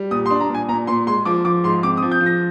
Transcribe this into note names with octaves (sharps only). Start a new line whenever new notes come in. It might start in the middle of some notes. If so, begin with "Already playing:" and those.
Already playing: G3
A#2 D#6
C6
D4
A#5
A#2
G#5
A#2 A#5
A#2 C6
G#3 C6
F3 D6
F3 D6
G#2 C6
C4 D6
D#6
F3
G6
F3
A#6